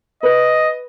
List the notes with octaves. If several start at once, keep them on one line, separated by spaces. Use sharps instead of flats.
B4 D#5